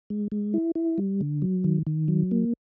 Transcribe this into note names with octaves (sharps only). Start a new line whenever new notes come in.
G#3
G#3
E4
E4
G3
D3
F#3
D#3
D#3
F#3
A#3